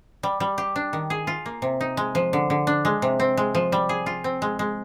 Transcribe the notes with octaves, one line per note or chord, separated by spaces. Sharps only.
G3
G3
G4
D4
D#3
G#4
F4
A#3
C3
D#4
G#3
F3
D3
D3
D4
G#3
C3
C4
G#3
F3
G3
G#4
F4
C4
G#3
G#3